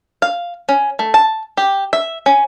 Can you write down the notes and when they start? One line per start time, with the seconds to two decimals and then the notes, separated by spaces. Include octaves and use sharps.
0.22 F5
0.69 C#4
0.99 A3
1.14 A5
1.57 G4
1.93 E5
2.26 C#4